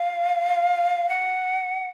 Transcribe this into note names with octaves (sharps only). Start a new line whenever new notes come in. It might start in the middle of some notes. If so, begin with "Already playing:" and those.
Already playing: F5
F#5